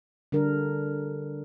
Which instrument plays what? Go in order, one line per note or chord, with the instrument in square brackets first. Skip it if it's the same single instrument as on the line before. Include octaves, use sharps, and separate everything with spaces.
[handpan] D3 G3 D4 A#4